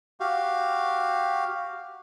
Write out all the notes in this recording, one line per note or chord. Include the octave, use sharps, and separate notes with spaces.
F#4 G4 F5